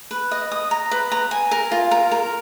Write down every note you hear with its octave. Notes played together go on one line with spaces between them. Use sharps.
B4
D#5
D#6
A#5
B4
A#5
G#5
A#4
F4
A#4
A#4